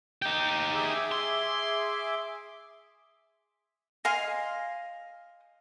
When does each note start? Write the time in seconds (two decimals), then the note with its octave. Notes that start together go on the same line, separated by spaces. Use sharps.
0.22 D#4 G4
0.75 G#4 E5 D6
1.12 C6
4.05 D#5 F5 G#5 C6